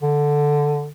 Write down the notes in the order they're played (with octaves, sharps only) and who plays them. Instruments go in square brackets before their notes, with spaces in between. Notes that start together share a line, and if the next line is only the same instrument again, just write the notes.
[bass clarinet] D3